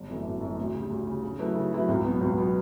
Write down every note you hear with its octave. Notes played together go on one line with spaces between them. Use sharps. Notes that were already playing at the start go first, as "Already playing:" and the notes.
Already playing: G1
F#2 E3 A3
G1
F#2 E3 A3
D2
C#3 G3
D2
C#3 G3
C#3
F#3 A3 E4 B4
C#3
F#3 A3 E4 B4
C#2
B2 F#3 B3
C#2
B2 F#3 B3